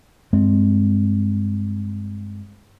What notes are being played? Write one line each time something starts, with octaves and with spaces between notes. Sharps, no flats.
G2 G#3 C4